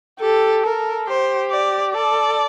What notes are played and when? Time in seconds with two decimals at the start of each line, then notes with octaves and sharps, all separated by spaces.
0.20 G4 A4
0.63 A4 A#4
1.07 G4 C5
1.51 D5
1.94 A4 D5